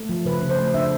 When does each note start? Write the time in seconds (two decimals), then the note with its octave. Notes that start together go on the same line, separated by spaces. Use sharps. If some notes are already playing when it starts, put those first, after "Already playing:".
Already playing: A3
0.09 F3
0.25 C#3 B4
0.42 C#3
0.49 C5
0.57 A3
0.74 D4 E5